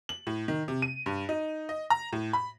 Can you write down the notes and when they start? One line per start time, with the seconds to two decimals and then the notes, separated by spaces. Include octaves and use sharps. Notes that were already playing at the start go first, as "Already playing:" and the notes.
0.09 F#7
0.27 A2
0.48 D#3
0.68 C3
0.82 D#7
1.06 G2
1.29 D#4
1.69 D#5
1.90 A#5
2.13 A2
2.33 B5